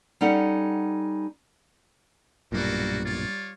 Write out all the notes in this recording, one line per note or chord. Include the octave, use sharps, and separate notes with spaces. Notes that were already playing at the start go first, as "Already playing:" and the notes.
G3 C#4 D#4 A4 F#5
B1 G2 A#2 G3 A#3 F#4 A4
F4 C#5 D5